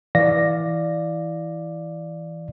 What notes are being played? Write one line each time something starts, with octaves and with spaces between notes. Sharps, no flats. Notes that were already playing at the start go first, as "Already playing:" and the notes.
E3 D5 F5 A#6